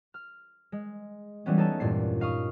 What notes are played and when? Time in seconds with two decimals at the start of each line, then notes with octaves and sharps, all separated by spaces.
0.14 F6
0.72 G#3
1.46 E3 G3 G#3 B3 C#4
1.57 D#4 A4 C#5 A5
1.80 E2 G2 A#2 C#4 D4 C7
2.20 D#4 F5 C#6 D#6